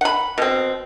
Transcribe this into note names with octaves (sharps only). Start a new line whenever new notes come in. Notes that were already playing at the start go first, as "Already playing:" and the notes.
F#5 B5
B2 C4